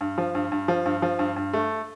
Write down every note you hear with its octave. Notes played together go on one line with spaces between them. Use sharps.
G2
F3
G2
G2
F3
G2
F3
G2
G2
A3